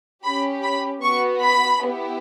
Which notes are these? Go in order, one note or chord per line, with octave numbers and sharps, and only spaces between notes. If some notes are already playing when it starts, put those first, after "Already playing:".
C#4 G4 B5
B5
B3 F#4 C#6
B5
B3 E4 G4